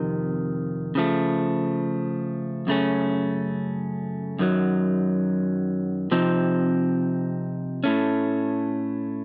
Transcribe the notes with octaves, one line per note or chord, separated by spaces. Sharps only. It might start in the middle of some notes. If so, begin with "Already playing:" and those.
Already playing: F2 C3 D#3
C#3 F3 A3
F#2 C#3 A3 C#4
F#2 D#3 F#3
C3 F3 C4 D#4
A2 A3 C#4